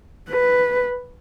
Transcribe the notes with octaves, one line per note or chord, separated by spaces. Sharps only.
B4